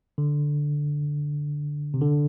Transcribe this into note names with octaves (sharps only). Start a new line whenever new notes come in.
D3
C3
D3